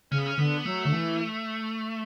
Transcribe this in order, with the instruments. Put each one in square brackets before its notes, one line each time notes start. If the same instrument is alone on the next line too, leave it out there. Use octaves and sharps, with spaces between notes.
[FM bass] C#3 [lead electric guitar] C#4
[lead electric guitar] B3
C#4
[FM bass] D3 [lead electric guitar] B3
[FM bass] F#3 [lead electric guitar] A3
[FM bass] D3
E3